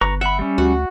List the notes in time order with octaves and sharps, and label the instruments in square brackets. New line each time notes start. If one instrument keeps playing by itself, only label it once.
[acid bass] G1 [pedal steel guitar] B4 A#5 C#6
[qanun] E5 [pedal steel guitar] F#5 B5
[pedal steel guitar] G3 C#4
[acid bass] D2 [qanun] F#4